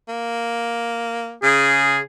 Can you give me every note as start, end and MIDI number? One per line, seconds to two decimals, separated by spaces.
0.08 1.36 58
1.43 1.99 49
1.43 1.99 68